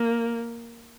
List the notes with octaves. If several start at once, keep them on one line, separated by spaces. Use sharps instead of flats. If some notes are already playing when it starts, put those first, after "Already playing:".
Already playing: A#3